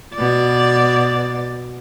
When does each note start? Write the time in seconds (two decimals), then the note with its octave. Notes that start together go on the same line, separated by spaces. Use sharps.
0.15 B2 D5